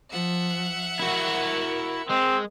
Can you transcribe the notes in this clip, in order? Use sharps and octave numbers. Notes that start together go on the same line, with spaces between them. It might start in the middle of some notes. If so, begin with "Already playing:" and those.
F3 E5 F#5
E4 F#4 A#4
G#3 C4